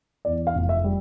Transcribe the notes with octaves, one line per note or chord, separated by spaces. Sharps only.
E2 D5
F5
F1
E5
G3